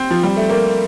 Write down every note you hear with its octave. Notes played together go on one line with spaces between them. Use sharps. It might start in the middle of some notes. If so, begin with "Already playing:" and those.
Already playing: C4
F3
G3
A3
A#3